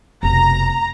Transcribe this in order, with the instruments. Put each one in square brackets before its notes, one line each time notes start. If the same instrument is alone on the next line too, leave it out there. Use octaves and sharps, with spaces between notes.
[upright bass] F1 B2 [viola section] A#5